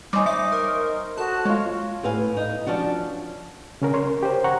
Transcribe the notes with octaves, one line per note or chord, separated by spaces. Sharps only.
G3 D#4 C5 C#5 G#5 D6
E5 D6
A#4
F#4 A4 A5
G#3 F4 C#5
A2 B4 F5 G#5
D#4
F3 C#4 D4 F#4
C#3 C#4 A#4
A#4 C#5 C6
G4 C5
F#5 A#5 C#6